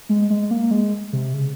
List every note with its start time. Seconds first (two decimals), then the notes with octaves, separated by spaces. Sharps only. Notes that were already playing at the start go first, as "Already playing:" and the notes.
0.09 G#3
0.30 G#3
0.51 A#3
0.71 G#3
1.13 C3
1.33 C#3